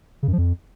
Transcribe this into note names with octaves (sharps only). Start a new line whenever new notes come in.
C#3
F#2
F3
F2